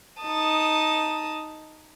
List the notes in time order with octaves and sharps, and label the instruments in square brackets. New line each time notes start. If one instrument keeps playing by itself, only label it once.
[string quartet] D#4 A5 D#6